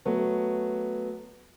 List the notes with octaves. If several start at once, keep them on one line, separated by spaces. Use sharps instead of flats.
F#3 A3 B3